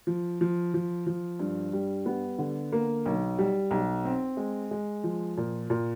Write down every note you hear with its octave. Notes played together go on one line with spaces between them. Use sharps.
F3
F3
F3
F3
G2
G3
B3
D3
A#3
B1
G3
B1
C4
G#3
G#3
F3
A#2
A#2